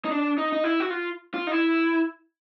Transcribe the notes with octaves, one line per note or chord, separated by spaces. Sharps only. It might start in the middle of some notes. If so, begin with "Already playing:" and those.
D#4
D4
D#4
D#4
E4
F#4
F4
F4
D#4
E4